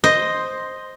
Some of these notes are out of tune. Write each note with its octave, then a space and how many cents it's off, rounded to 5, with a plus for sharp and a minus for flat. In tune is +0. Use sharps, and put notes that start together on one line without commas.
C5 +0 D#5 +0